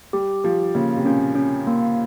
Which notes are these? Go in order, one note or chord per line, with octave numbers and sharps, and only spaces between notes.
G3 G4
F3 G4
C#3 A#3
C3
A#2 C#4
C#4
A#3